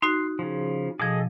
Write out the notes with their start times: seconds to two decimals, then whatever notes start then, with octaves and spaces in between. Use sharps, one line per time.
0.02 D#4 F#4 C6 F#6
0.39 C#3 F3
1.00 B2 F3 G#4 A4 D#5